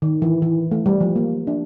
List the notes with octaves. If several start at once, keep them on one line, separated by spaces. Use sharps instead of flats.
D#3
E3
E3
A3
G3
F3
A#3
D4